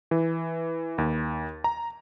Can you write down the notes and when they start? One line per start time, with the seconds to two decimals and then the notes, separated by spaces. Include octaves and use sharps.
0.11 E3
0.98 D#2
1.64 A#5